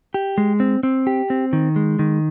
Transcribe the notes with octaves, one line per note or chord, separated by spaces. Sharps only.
G4
G#3
C4
C4
G4
C4
D#3
G#3
D#3